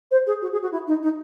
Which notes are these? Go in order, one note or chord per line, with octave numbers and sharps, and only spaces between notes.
C5
G#4
F#4
G#4
F#4
E4
D#4
D#4